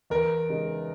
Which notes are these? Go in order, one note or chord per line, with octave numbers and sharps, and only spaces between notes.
E2 A#4
C#3 G#3 D#4